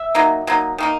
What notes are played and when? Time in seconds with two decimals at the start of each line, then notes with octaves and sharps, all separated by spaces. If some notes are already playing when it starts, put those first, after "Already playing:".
Already playing: E5
0.15 F#3 A#3 D#4
0.47 F#3 A#3 D#4
0.78 D#3 A#3 D#4